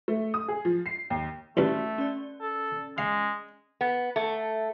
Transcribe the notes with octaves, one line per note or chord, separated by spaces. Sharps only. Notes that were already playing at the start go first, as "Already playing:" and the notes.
A3
D#6
G#4
F3
C7
D#2
A1 G2 A3 C#4 F#4 D5 B5
C#4 D5
A4
G#3 F5
B3
A3